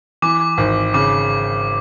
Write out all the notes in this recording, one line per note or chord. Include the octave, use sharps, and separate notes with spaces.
E3 D6
G#1
C#3 D6